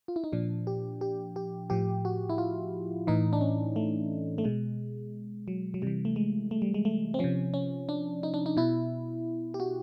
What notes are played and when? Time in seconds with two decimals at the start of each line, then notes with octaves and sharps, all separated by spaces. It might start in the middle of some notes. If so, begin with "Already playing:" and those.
0.08 F4
0.16 E4
0.24 D#4
0.32 A#2 F3 D4
0.67 G4
1.01 G4
1.36 G4
1.70 A2 F3 G4
2.05 F#4
2.29 E4
2.38 F4
3.07 A2 E3 D#4
3.33 D4
3.41 C#4
3.76 A3
4.38 A3
4.44 B2 G#3
5.48 F#3
5.74 F#3
5.82 C3 E3 G3
6.05 A3
6.16 G#3
6.51 A3
6.62 G3
6.74 G#3
6.85 A3
7.14 C4
7.19 C3 F3 C#4
7.54 C#4
7.89 D4
8.23 D#4
8.34 D4
8.46 D#4
8.57 B2 E4
9.54 G4
9.60 F#4